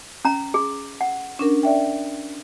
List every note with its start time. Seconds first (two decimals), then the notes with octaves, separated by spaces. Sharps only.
0.25 C#4 A#5
0.54 G#4
1.01 F#5
1.39 C#4 D4 A#4
1.63 D5 E5 G5